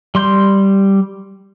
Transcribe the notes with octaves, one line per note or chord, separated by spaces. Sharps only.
G3 C6 G6